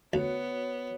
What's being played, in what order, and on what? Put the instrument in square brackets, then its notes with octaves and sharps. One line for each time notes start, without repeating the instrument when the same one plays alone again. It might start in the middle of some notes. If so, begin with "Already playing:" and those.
[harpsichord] D2 [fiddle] B3 [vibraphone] F#4 C#5